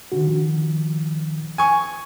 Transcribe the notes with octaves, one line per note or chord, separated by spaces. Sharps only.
D3 D#3 F#4
D#3 F3
G#5 C#6